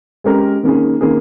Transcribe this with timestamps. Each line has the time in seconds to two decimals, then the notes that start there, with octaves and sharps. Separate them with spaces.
0.24 G#3 C#4 G4 A#4
0.63 D#3 A#3 C#4 G#4
1.01 D#3 A#3 C#4 G#4